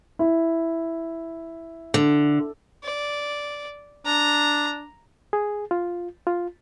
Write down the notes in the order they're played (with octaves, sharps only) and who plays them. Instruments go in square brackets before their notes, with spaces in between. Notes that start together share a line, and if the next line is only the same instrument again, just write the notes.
[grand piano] E4
[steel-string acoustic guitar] D3
[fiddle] D5
[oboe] D4 [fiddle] A#5
[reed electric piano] G#4
F4
F4